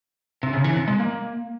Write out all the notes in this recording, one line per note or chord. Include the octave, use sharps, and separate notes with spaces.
C3
C#3
E3
C3
G#3
A#3